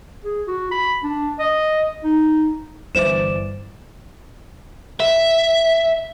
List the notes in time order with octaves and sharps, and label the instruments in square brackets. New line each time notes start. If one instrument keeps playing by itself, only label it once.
[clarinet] G#4
F#4
B5
D4
D#5
D#4
[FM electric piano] G1 E3 D5 [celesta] C5 E7
[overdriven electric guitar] E5